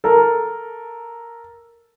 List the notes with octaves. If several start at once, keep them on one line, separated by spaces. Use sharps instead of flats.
A4 A#4